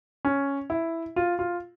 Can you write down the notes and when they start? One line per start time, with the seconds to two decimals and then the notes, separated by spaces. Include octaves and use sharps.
0.25 C#4
0.70 E4
1.16 F4
1.39 F4